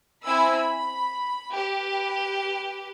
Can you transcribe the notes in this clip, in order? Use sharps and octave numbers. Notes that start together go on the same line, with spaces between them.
C4 E4 G#5 B5 E6
B5
G4 B4